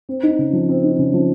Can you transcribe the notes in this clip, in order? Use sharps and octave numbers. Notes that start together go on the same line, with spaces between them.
C4
D#4
C#3
F3
C4
D#4
C#3
F3